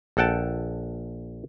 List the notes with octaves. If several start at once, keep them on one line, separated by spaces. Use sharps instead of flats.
A#1 A4 F#5 G5 A5